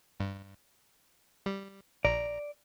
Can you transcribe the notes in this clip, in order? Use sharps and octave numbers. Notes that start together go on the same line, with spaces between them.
G2
G3
A#1 D5 A#5